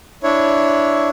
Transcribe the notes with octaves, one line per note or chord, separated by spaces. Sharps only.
D4 E4 C#5